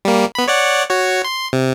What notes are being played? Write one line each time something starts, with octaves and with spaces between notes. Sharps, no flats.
G3 A#3
B3 B5
C#5 D5 F#5
F#4 C#5
C6
C3